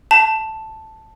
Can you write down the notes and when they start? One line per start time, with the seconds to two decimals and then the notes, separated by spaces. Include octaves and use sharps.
0.11 A5